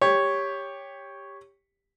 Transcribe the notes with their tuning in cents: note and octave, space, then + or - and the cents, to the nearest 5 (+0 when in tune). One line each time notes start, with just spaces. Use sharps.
G4 +15 C#5 +0